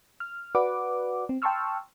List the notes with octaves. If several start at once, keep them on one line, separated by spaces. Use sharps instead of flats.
F6
F#4 B4 D5 F#5 D6
C4
G5 A5 C6 C#6 E6 F6